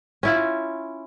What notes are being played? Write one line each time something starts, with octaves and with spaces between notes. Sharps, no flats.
C#4 E4 F4